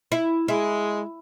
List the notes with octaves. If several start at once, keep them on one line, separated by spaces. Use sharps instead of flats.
E4
G#3 E4